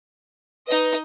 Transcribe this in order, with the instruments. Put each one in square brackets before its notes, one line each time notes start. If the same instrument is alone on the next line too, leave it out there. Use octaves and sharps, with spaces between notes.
[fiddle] D#4 D#5 [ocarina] B4